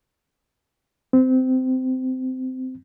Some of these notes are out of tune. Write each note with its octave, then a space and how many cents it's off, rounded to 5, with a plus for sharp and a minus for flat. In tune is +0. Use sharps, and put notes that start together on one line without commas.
C4 -20